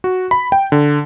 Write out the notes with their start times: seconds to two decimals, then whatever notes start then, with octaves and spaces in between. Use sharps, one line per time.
0.04 F#4
0.31 B5
0.52 G5
0.72 D3